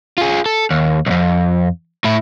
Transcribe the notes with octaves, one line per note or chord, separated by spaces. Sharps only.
F4 G#4
A4
D#2
B1 F2
A2 E4